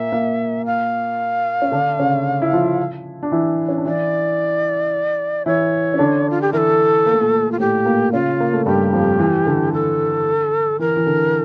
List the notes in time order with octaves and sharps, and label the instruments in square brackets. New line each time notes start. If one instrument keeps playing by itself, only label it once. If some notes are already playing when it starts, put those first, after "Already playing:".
Already playing: [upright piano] A#2 A#3 [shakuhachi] E5
[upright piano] A#2 A#3
[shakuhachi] F5
[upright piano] C#4
D3 D4
C#3 C#4
E4
F3 F4
D4
E3 E4
C#4
D4
[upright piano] E3 E4 [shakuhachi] D5
[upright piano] E3 E4 [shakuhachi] C#5
[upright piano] C#4
D3 D4
[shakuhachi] F4
G4
[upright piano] E3 E4 [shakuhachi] A4 A#4
[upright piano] A#3
A3
A#2 A#3
[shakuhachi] F4
[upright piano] A2 A3 [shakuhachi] G4
[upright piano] A#2 A#3
[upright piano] C#3 C#4 [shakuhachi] F4
[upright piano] A#3
A3
[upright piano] G2 G3 [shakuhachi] G4
[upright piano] F2 F3
E3
D3
[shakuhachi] A4
[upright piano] E3 [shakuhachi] A#4
[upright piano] E3
D3